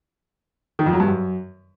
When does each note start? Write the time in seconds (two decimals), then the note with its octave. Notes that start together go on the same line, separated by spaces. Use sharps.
0.79 D#3
0.86 F2
0.93 F#3
1.00 G2
1.07 F#2